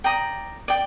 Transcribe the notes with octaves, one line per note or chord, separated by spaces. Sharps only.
D5 G5 A#5 D#6
D5 G5